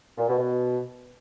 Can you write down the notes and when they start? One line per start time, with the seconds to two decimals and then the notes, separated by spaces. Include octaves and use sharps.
0.18 A#2
0.28 B2
0.38 B2